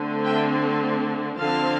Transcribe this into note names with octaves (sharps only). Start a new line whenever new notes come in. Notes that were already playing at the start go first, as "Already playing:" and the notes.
Already playing: D3 A3 C4
E5 G5
D3 F3 C4 F5 A5